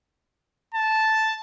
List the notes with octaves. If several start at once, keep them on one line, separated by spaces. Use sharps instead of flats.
A5